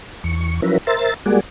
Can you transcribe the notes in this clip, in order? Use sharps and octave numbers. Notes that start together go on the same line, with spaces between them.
E2 C#6
F3 F#3 C#4 E4 A#4 B4
A#4 C5 E5 A6
G3 G#3 A#3 F#4 G#4 D5